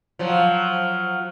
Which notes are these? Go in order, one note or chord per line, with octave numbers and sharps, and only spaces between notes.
F3 F#3